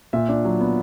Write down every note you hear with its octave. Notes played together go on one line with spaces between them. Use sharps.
A#2 E5
D4
F#3
B3